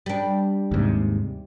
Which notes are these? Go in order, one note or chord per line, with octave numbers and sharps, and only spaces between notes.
G3 D4
D#2 G#2 C3